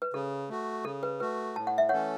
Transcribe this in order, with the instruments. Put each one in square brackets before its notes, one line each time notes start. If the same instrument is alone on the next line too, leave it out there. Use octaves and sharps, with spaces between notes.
[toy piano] B4
[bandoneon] C#3 [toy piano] A4
[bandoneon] A3 F#4
[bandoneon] C#3 [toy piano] A4
[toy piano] B4
[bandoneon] A3 F#4 [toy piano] B4
[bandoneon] A2 [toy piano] A5
[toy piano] F#5
E5
[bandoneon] E3 A3 C#4 A4 [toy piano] C#5 F#5